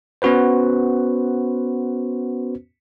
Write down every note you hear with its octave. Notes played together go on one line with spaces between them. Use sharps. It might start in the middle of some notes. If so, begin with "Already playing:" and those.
B3 C#4 F#4 B4 C5